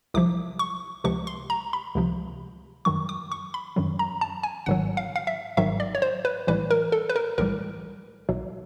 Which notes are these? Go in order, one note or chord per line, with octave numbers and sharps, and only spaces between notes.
C2 C3 F3 D6
C#6
C#2 C3 F3 C#6
C6
A#5
B5
C#2 C3 F3
F#2 D#3 F#3 C#6
D6
C#6
B5
F#2 D#3 F#3
A#5
A5
G#5
G#1 G#2 D#3 F#3 F#5
F5
F5
E5
G#1 G#2 D#3 F#3 E5
D5
C#5
C5
B4
B1 A2 E3 G3 B4
A#4
A4
B4
A#4
B1 A2 E3 G3 A#4
B1 B2 F#3